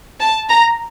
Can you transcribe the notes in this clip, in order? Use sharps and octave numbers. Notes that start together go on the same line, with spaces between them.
A5
A#5